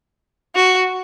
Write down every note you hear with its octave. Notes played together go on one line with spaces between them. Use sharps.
F#4